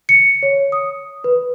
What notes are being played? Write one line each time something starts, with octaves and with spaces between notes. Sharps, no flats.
C#7
C#5
D#6
B4